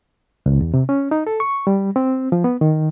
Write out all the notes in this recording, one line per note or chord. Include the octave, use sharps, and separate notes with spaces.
C#2
E2
C3
C#4
D#4
A4
C#6
G3
C4
F3
B3
D#3